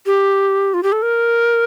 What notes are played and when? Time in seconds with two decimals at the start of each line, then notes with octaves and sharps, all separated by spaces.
0.06 G4
0.74 F4
0.83 G4
0.92 A4
1.02 A#4